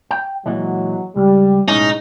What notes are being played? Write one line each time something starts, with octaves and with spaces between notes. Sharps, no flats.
G5
A#2 E3 F#3 G#3
C#2 G3
B1 A2 G#3 C#4 D#4